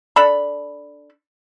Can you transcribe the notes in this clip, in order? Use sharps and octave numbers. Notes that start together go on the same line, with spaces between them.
D4 A4 B5